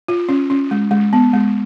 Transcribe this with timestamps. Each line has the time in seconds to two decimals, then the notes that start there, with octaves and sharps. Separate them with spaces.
0.08 F4
0.29 C#4
0.50 C#4
0.71 G#3
0.91 G#3
1.13 B3
1.33 G#3